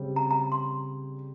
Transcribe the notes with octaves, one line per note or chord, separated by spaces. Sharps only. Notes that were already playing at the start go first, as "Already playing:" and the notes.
Already playing: C#3 G3 C4 G4
A#5
A#5
C6